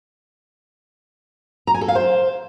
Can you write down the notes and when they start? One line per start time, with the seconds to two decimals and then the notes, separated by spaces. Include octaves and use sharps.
1.67 A#5
1.74 G#5
1.81 A4
1.88 F5
1.95 C5